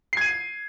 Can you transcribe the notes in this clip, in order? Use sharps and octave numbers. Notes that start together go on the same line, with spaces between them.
G#6 C7 D#7